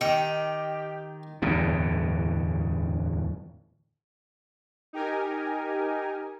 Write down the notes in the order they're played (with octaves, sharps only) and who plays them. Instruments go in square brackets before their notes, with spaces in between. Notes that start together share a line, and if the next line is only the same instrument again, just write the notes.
[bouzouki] D#3 [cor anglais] G4 [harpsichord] G5
[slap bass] D1 E2 G2 B2
[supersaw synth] D#4 G4 A#4 G#5